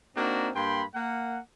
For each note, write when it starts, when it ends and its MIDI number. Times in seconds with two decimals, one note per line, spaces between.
0.16 0.49 58
0.16 0.49 60
0.16 0.49 62
0.16 0.49 63
0.16 0.49 66
0.55 0.83 43
0.55 0.83 58
0.55 0.83 79
0.55 0.83 83
0.55 0.83 84
0.95 1.38 58
0.95 1.38 78